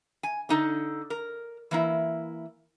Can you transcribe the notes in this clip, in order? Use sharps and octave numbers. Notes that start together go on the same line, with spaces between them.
G#5
D3 D#4 A4
A#4
E3 A#3 E4